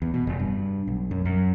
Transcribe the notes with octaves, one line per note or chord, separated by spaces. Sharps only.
E2
B2
F1
G2
B1
F#2
F#2